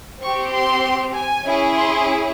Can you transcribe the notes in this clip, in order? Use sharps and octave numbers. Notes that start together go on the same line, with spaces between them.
C4 G4 C#6
C6
G#5
C#4 E4 G#4
C6